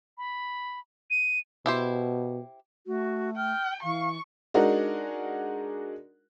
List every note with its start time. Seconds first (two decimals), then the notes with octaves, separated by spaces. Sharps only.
0.18 B5
1.10 D#7
1.66 B2 E4 G4 C5
2.87 A3 F#4
3.37 G5 F6
3.83 E3 F5 C#6
4.54 G#3 D4 D#4 F#4 A#4